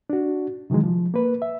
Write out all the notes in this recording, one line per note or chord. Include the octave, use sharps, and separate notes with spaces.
D4 F#4
C3 D#3 E3 F#3 G#3
F3
A#3 B4
E5